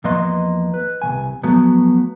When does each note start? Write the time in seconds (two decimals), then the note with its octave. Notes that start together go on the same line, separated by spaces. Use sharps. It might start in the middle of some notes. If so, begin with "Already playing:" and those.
0.04 E2 F3 A#3 B4 D#5 C6
0.74 B4
1.02 C2 C#3 G#5
1.43 F3 F#3 A3 B3